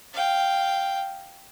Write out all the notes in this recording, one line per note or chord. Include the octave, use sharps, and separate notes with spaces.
F5 G5